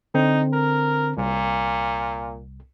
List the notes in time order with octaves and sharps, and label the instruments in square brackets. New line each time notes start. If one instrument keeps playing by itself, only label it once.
[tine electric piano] D3 C4 [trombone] D#4
[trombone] A#4
[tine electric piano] C2 [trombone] A#2